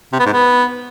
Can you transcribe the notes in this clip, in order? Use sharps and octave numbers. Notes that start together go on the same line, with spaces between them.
C3
B3
G#2
B3